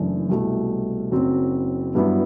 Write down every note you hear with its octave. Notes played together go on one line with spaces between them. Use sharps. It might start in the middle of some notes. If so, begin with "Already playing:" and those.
Already playing: F#1 F#2 E3 A3 D4
C2 B2 A3
F#1 F#2 F#3 C4
G2 F#3 B3 E4